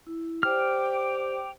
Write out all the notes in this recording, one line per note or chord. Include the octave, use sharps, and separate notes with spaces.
E4
G4 C5 D5 G5 D6 F6